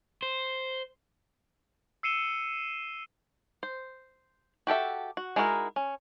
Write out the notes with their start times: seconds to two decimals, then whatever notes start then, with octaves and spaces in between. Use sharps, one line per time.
0.23 C5
2.03 E6 C7 C#7 D#7 E7 G7
3.63 C5
4.67 F#4 G4 A4 E5
5.17 F#4
5.36 G#3 D#4 E4 F#4 A#4
5.76 C#4